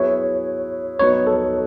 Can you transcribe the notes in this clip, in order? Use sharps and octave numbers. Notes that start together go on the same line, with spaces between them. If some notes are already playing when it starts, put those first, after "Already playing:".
Already playing: F#3 B3 E4 G#4 C#5
F#3 B3 D#4 C#5
A4